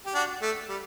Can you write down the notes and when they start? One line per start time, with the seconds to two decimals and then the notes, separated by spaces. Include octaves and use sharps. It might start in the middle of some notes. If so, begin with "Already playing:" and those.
0.06 G4
0.15 D4 F#4
0.42 A3
0.69 G3